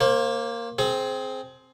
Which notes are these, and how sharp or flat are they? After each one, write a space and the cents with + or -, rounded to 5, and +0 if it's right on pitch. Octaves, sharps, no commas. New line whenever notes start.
A#3 +0 C5 +35
C4 +0 G#4 +25